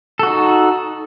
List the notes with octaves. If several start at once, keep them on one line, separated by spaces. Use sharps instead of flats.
D#4 F#4 A4